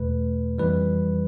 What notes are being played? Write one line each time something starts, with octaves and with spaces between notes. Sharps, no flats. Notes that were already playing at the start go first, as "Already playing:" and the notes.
Already playing: E2 B2 A3 B4
F2 E3 G3 B4